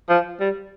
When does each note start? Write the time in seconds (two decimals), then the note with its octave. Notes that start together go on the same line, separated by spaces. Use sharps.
0.10 F3
0.40 G3